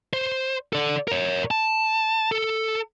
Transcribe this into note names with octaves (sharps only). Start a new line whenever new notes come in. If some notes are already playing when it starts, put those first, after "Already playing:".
C5
A4 D5
A#4 C#5
A5
A4